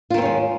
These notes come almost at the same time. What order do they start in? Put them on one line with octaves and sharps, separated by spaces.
F4 D#3 C4 C#4 G#3